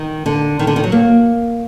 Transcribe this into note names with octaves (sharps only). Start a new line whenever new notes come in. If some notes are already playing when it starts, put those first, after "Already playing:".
Already playing: D#3
D3
D#3
D3
D#3
F#3
A#3